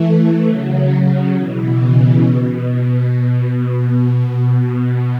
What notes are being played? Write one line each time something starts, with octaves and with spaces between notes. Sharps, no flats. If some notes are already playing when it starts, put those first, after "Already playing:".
Already playing: E3 A3
C#3 F#3
C#3 F#3
B2 E3
C#3
B2
B2